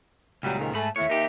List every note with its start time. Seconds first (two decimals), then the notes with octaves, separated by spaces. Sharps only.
0.43 C#2 A#2 F#3 G3
0.58 F2 G#2 D#3
0.74 G#2 A3 G#5 A5 B5
0.96 D#2 A2 C#5 E5
1.10 D#2 D#4 G4